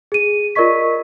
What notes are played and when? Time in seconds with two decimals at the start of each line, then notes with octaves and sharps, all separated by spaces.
0.12 G#4 D#7
0.55 F4 A#4 D5 D#5 C#6 B6